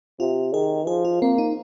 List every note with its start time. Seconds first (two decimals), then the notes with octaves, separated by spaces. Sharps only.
0.20 C3 F4
0.53 D#3 G#4
0.87 F3 G#4
1.05 F4
1.22 A#3 C4
1.38 D#4